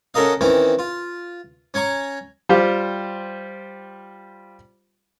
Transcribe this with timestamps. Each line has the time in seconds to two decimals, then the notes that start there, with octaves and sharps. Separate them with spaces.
0.14 C#4 F#4 A4 A#4 D#5 F5
0.41 D#3 E3 C4 C#4
0.79 F4
1.74 C#4 C#5 G#5 A#5 C#6
2.49 G3 F4 G4 C5